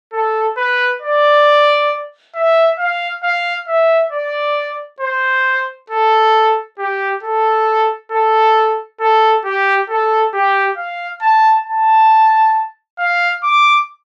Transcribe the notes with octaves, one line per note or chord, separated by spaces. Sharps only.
A4
B4
D5
E5
F5
F5
E5
D5
C5
A4
G4
A4
A4
A4
G4
A4
G4
F5
A5
A5
F5
D6